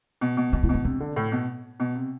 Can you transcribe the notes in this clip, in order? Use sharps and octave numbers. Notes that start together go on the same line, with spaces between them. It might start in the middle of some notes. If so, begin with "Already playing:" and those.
B2
B2
B2 C4
E4
B2 D4
C3 D4
D3
A2
B2
B2
C3